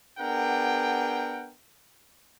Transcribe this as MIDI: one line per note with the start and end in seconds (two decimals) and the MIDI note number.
0.19 1.52 59
0.19 1.52 62
0.19 1.52 68
0.19 1.52 70
0.19 1.52 78
0.19 1.52 79